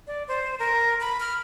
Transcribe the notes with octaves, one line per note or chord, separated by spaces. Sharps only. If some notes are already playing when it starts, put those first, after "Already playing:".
D5
C5
A#4
B5
F6